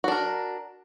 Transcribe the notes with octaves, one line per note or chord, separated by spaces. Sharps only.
D4 F#4 A#4